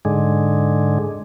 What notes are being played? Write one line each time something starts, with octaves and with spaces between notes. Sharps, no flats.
G#2 D3 G#3